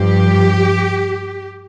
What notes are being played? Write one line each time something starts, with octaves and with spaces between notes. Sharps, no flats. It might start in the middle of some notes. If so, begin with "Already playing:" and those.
Already playing: G2 F3 G4